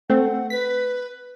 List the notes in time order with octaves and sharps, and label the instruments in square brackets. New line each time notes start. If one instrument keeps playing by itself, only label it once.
[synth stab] A3 C4 [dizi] F#5
[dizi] B4 [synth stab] B6